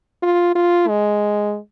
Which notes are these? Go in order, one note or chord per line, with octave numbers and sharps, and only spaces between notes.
F4
F4
G#3